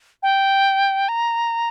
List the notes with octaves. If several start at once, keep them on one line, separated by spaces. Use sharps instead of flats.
G5
A#5